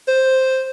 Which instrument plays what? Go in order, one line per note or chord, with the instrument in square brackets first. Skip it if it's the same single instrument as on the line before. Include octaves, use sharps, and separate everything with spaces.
[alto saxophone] C5